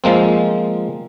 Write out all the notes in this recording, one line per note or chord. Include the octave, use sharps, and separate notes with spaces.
F3 G#3 A#3 C4